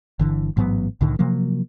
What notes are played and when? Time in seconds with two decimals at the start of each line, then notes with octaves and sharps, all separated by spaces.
0.19 G1 D3 E3
0.57 A1 G#2 F#3 B3
1.01 C2 A2 D3 D#3
1.19 C3 F3 F#3 A#3